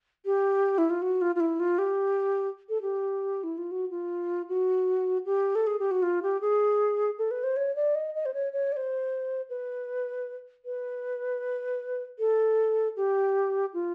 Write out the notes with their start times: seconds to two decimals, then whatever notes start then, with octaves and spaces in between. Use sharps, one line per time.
0.25 G4
0.78 E4
0.90 F4
1.02 F#4
1.21 F4
1.35 F4
1.40 E4
1.60 F4
1.78 G4
2.69 A4
2.82 G4
3.43 E4
3.58 F4
3.71 F#4
3.90 F4
4.49 F#4
5.25 G4
5.55 A4
5.67 G#4
5.79 G4
5.91 F#4
6.02 F4
6.23 G4
6.41 G#4
7.18 A4
7.31 B4
7.43 C5
7.56 C#5
7.76 D5
7.95 D#5
8.15 D#5
8.25 C5
8.34 C#5
8.53 C#5
8.72 D5
8.76 C5
9.49 B4
10.65 B4
12.19 A4
12.96 G4
13.74 F4